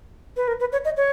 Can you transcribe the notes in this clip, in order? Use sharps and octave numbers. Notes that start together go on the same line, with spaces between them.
B4
A#4
B4
C#5
D#5
C#5